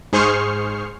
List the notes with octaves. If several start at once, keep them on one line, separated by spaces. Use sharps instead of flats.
G#2 G#4 C5 C#6 F6 C7